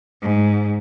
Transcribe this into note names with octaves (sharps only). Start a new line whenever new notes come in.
G#2